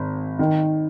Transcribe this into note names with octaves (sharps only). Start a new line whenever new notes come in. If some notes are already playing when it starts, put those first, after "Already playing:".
Already playing: G#1
D#3